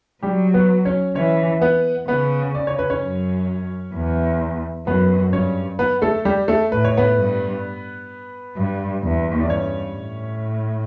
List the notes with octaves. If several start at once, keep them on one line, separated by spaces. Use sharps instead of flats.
F#3 G3 G4
B3 B4
C#4 C#5
E3 C#4 C#5
B3 B4
C#3 B3 B4
D5
C#5
B4
C#4 C#5
F#2
E2
F#2 B3 B4
G2 C#4 C#5
B3 B4
A3 A4
G3 G4
A3 A4
A2 B4
C#5
B3 B4
G2
G2
E2
D5
G2 C#4 C#5
A2